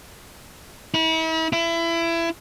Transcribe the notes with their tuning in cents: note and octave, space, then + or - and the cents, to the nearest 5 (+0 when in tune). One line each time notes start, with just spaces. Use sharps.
E4 -40
E4 +25